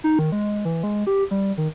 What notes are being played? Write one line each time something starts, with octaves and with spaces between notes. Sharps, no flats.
D#4
D#3
G#3
E3
G#3
G4
G3
D#3